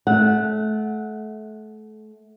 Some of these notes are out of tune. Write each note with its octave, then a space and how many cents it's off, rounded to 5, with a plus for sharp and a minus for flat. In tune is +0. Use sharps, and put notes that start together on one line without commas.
A3 -30 F#5 -10